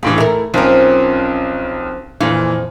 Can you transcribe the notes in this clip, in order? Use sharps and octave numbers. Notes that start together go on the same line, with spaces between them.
C#2 A2 E3 G4
A3 E4 A#4
B1 F3 C4 C#4 A#4
F2 A#2 E3 F5